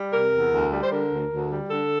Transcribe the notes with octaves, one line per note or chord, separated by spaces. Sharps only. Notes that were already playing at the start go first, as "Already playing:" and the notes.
Already playing: G3
C3 A#4
E2
D2
G3
C5
D3 A#4
D2
D2
G3
D3 A4